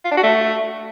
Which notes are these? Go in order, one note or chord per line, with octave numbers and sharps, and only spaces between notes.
F4
D4
F#4
A3